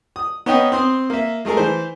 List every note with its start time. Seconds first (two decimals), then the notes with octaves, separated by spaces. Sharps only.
0.16 D#6
0.46 B3 C#4 D#4 D#5 G5
0.72 C4 C6 D#6
1.10 A#3 E5
1.45 G#3 A3 G#4 A#4
1.57 E3 C5